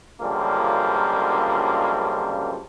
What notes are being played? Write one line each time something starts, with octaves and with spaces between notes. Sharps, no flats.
C#2 F#2 D3 F3 G3 A#3